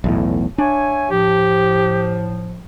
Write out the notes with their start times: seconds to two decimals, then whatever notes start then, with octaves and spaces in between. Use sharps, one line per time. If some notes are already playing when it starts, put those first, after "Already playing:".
0.04 B1 E2 A2
0.58 D4 C#5 E5 G#5
1.11 A2 F3 G4